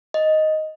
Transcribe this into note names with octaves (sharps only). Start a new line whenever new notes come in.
D#5